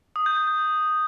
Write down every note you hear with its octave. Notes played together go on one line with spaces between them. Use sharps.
D#6
G6
G6
G6